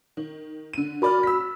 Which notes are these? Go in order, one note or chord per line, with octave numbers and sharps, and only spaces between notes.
D#3
D3 D#7
F#4 A#4 D5 B5 F6
E6 B6